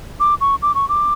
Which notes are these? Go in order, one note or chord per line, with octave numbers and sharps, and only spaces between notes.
D6
C#6
D6
C#6
D6